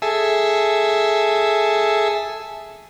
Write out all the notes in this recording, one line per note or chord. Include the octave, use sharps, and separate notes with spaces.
G#4 A4 E5